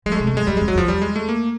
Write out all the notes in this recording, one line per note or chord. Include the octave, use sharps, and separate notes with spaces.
F3 G#3
A3
C3 G#3
A3
F#2
G#3
F#2 G3
F2 G#3
F#3
F2
F3
E2 G3
G#3
A3
A#3